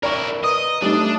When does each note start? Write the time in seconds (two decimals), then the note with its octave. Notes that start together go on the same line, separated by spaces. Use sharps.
0.03 E4 A#4 D5 C#6
0.44 B4 D#5 D#6
0.82 G3 A3 D4 D#4 D5